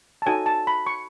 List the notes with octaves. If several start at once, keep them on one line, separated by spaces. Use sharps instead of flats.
A5
D#4 F#4 A4 C#5 G#5
A5
B5
C#6